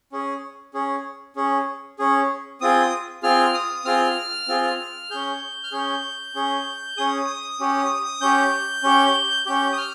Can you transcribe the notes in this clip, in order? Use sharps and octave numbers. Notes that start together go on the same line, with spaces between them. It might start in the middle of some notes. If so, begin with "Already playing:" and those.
C#4 G#4
C#4 G#4
C#4 G#4
C#4 G#4
C4 F4 G#4 D#6
C4 F4 G#4 F6
D#6
C4 F4 G#4 F6
C4 F4 G#4
C#4 G#4 G6
F6
C#4 G#4 G6
C#4 G#4
C#4 G#4 D#6
C#4 G4
C#4 G4 G6
C#4 G4
C#4 G4 G6
D#6
F6